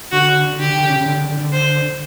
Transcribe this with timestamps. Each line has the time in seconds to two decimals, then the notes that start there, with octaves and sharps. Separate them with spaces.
0.12 D3 F#4
0.59 D3 G4
0.75 D3
0.89 C#3
1.06 D3
1.17 D3
1.29 D3
1.41 D3
1.52 C5